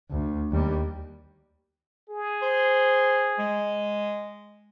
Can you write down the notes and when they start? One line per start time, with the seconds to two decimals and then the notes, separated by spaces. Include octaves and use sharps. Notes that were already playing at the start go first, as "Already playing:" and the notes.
0.11 D2
0.52 D#2 G3
2.09 G#4
2.42 C5
3.39 G#3